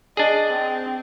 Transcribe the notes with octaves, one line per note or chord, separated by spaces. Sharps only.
D4 G#4 D#5
C4